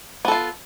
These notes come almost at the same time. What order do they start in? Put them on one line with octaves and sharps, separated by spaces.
B3 A4 F4